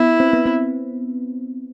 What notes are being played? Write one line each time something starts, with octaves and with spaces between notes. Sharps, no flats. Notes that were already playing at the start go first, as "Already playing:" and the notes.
Already playing: B3 E4
C4
B3
C4